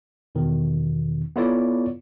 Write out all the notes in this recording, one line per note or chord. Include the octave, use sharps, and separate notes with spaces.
E2 B2 D#3
B3 E4 F4 A4 C#5 D5